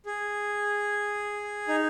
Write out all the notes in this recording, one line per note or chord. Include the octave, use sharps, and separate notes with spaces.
G#4
D#4